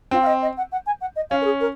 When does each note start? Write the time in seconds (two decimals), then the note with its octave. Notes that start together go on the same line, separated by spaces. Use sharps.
0.11 C4 F4
0.22 F5
0.26 D#5
0.42 D#5
0.57 F#5
0.72 F#5
0.86 G#5
1.01 F#5
1.16 D#5
1.30 C#4 F5
1.41 A#4
1.45 G#4
1.60 A#4